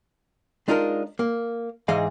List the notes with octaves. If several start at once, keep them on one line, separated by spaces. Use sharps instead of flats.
G#3 D4 D#4 F4 A4 A#4
A#3
G#2 E3 G#4 D#5 F5